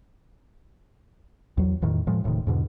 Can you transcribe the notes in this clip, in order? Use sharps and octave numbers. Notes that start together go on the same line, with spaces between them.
E2 F#3
E2 A2 D#3
A2 F3 G#3
D#1 A2 C3 D#3
E2 G#2 B2 D3